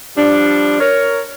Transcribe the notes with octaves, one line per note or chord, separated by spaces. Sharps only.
F3 G3 D4
A#4 C#5